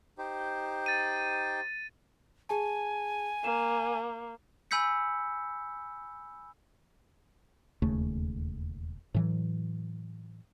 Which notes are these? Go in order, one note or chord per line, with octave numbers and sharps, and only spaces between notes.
D#4 G4 C5
A6 D#7
G#4 G#5 A5
A#3 E7
G#5 B5 E6 G6 B6 C#7
E1 D#2 C#3 A3
A2 E3 F#3